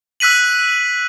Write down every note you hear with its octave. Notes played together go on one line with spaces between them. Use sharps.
E6 F#6 B6 D#7 F#7